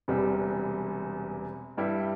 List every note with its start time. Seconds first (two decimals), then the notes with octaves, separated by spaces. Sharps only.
0.08 E1 E2 C3 G3
1.77 G2 G3 E4 G4